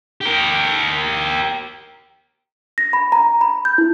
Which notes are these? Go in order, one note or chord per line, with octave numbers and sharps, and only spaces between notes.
G4 A#4
A#6
B5
A#5
B5
G6
E4